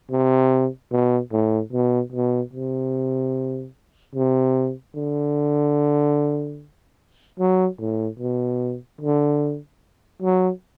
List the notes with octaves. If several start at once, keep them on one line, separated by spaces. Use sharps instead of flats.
C3
B2
A2
B2
B2
C3
C3
D3
F#3
A2
B2
D3
F#3